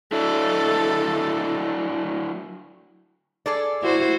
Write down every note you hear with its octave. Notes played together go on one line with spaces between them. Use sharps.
F#3 D4 E4 A4
G#4 A4 D5
E4 F#4 C5